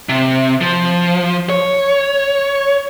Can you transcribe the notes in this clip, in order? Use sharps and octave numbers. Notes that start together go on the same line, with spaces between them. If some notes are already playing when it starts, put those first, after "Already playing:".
C3
F3
C#5